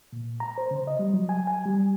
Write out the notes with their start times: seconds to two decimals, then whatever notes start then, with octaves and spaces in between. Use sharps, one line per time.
0.13 A#2
0.40 A#5
0.58 C5
0.71 C#3
0.87 D#5
0.99 G3
1.14 F#3
1.29 G#5
1.47 G#5
1.66 G3